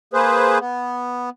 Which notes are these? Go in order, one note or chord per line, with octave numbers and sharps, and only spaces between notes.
A#3 G#4 B4 C5
B3